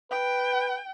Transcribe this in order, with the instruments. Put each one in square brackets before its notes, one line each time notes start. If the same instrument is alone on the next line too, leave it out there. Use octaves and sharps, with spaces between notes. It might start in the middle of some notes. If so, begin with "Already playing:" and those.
[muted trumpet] B4 [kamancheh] G5